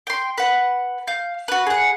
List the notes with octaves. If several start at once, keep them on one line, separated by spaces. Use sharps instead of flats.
G5 C6
B4 F#5
F5 G6
F#4 B4
G#4 F#5